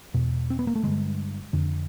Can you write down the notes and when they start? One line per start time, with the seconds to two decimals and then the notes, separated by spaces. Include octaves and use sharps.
0.14 E2 B2
0.50 C4
0.59 B3
0.67 A#3
0.76 A3
0.83 G2 D3 G#3
1.53 F2 D3